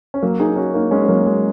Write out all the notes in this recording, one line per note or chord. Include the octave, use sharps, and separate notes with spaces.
C#4
F#3 A#3
D#4 G#4
C#4 F#4
A#3 D#4
G#3 C#4
C#4
F#3 A#3
G#3